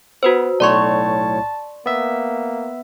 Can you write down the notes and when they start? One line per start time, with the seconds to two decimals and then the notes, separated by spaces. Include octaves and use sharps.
0.23 B3 F#4 B4 C5
0.60 B1 A2 C#5 D5 A5 C6 C#6
1.86 A#3 B3 E5